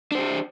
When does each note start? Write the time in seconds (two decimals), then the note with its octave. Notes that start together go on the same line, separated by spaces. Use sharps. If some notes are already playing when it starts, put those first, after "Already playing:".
0.12 D4
0.15 C5
0.18 G4